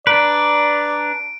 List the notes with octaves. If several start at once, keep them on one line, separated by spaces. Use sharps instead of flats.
D4 B4 D5 A#5 D7